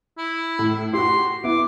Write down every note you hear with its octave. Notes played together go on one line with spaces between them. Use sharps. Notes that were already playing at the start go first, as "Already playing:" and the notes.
E4
A2
F#4 G4 C6
B3 E4 D6